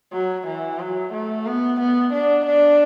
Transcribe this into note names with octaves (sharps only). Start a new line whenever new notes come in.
F#3
E3
F#3
A3
B3
B3
D4
D4